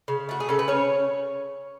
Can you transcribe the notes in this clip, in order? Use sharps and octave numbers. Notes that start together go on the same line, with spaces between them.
C#3
A3 F#4
G#4
C#3 A4
B4
C#4 C#5